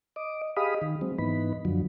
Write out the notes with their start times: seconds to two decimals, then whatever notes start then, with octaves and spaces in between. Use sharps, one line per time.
0.16 D#5 D6
0.57 G4 G#4 D#5 F5 B5 D#6
0.82 D#3
1.01 F#3 G#3 C4
1.18 G#2 E3 B3 D#4 B5
1.65 F#2 D3 F3 F#3